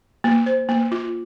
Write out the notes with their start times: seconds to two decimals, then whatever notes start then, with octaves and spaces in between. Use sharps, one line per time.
0.24 A#3
0.46 C5
0.69 A#3
0.92 F4